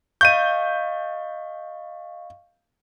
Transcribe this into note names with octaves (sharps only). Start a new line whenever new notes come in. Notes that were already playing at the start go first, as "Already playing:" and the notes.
D#5 F5 C#6 G6 D#7